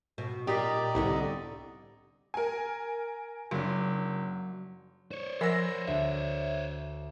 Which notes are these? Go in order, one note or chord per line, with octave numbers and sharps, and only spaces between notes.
B2
A#2 G3 D#4 G4 D5 D#5
C2 A2 D3 B3
A#4 G#5
F#1 F#3 D4
C5 C#5
F3 A#4 F#5 G#5 B5 C6 E6 A#6
D2 E5